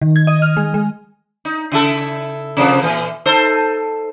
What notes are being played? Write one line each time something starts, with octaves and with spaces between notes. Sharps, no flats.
D#3
G#6
D#5
F6
G#3
G#3
D#4
C#3 E4 A4
C3 F3 B3
A#2 E3
D#4 A4 C5